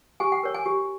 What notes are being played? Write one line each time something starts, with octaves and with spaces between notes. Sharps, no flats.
G4 G#5
G5
A#4 C#5
G#5
G4